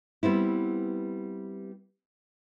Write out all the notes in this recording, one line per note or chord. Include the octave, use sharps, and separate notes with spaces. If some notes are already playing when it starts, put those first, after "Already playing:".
G3 B3 C4 E4